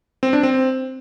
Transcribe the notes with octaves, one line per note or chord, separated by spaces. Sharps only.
C4
D4
C4